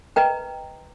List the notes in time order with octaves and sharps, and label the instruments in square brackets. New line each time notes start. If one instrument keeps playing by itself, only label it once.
[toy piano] B4 D#5 G5 A#5